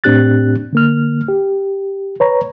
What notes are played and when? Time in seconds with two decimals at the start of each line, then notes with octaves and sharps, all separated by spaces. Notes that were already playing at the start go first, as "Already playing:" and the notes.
0.04 A2 C4 D4 G4 F#6 A6
0.73 D3 A#3 F6
1.29 G4
2.20 B4 C#5 A#5